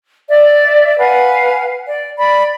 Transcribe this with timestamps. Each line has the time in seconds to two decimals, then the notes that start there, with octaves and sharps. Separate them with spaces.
0.29 D5 E5
0.99 B4 F5 F#5 G#5
1.87 D5
2.18 D5 B5